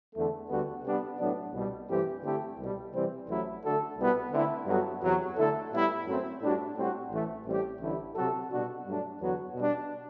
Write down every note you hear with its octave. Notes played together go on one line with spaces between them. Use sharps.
E2 D3 A3
D2 D3 G3 B3 F#4
C3 G3 B3 D4
A2 F#3 B3 D4
C2 B2 G3
G2 E3 A3 C4 G4
D3 A3 C4 E4 G4
C2 B2 G3
C3 E3 G3 C4
A1 A2 F#3 A3 E4
D3 A3 D4 F#4 A4
C2 B2 G3 B3 E4
D3 A3 C4 E4
G2 F#3 B3 F#4 A4
E2 C3 F#3
D3 A3 E4 A4
A2 G3 B3 E4
F#2 F#3 A3 C4
A2 G3 D4 F#4
A2 G3 C4 F#4
A1 A2 E3 A3
A1 A2 G3 C4 G4
A1 G2 D3 A3 E4
C3 F#3 C4 F#4 A4
B2 G3 D4 F#4
G2 F#3 A3 D4
E2 D3 F#3 B3 F#4
B2 G3 D4